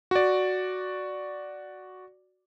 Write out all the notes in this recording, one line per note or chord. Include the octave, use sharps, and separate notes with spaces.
F#4 D5